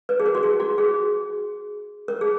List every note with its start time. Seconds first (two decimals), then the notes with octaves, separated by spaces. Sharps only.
0.09 B4
0.20 G#4
0.26 A#4
0.35 F#4
0.43 G#4
0.60 F#4
0.78 G#4
2.08 A#4
2.21 G#4